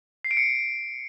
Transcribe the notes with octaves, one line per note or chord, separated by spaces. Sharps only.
C7
D7
C#7